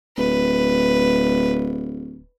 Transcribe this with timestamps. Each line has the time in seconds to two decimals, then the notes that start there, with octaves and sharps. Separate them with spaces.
0.18 D1 B4